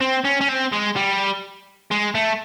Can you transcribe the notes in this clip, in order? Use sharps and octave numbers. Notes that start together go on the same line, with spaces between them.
C4
C#4
C#4
C4
G#3
G3
G#3
A3